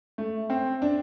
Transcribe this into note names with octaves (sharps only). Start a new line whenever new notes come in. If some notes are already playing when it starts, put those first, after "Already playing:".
A3
C4
D4